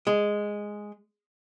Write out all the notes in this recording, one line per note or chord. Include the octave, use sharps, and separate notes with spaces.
G#3